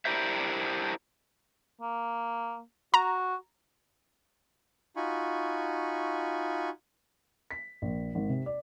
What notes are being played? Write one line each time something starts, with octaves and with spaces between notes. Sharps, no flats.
D4 E4 G4 A#4 C5 E5
A#3
F#4 A#5
D#4 F4 F#4 G#5 B5 C#6
B6
A#1
G#1
C3
D5